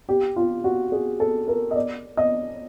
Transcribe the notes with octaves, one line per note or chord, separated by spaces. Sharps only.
G4
F4
F#4
G#4
A4
A#4
D#5
D5
D#5